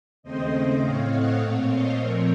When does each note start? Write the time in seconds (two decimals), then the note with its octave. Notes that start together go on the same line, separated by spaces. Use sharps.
0.23 D#2 C#3 A3 C4 C5 D#5
0.81 A2 A3 C4 C#5 F5
1.10 D#5 F#5
1.39 A#2 A3 C4 C#5 F5
1.69 C5 D#5
1.97 A#2 F3 A3 C4 A#4 C#5